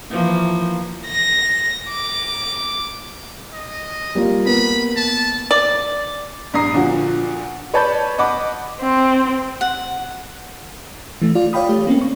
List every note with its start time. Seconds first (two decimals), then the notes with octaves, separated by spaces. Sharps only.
0.11 E3 F3 A#3
1.06 A#6
1.90 D6
3.53 D#5
4.15 G3 A#3 F4
4.46 A#3 B3 B5
4.96 A5
5.51 D5
6.54 A#1 G2 A#5 D#6 C7
6.74 A#2 D3 F3 F#4
7.74 B4 C#5 D5 A5 B5 G6
8.18 D#5 F#5 B5 D6
8.81 C4
9.61 F#5
11.22 E3 A3
11.35 F4 D5 F5
11.53 C#5 D5 F5 G5 B5 D#6
11.69 A3 G4
11.87 A#3 C4 C#4
12.01 C#6